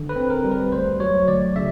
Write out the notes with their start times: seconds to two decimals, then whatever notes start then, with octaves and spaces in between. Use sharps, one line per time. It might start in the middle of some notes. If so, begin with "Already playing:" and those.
Already playing: D3
0.09 B4
0.16 C4
0.30 A#4
0.44 G3
0.51 B4
0.72 D2 C5
1.00 F#3 C#5
1.28 D2 D5
1.56 C#3 E5